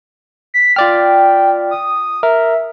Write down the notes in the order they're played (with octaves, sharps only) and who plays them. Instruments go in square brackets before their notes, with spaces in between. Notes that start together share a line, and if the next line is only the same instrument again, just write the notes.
[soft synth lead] B6
[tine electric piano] F4 D5 F6 [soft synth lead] G5
[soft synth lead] D#6
[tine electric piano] A#4 [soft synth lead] E5